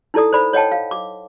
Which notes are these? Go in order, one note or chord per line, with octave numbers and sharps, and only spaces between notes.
D#4 E4 A4 D5 D#6
C5 D5 B5
C#5 D#5 F#5 G5 A5
F5
D6